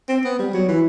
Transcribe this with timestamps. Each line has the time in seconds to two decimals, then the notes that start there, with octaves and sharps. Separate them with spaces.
0.09 C4
0.24 B3
0.39 G3
0.54 F#3
0.68 E3